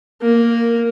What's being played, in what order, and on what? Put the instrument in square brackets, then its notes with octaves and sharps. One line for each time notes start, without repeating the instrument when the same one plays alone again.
[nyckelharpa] A#3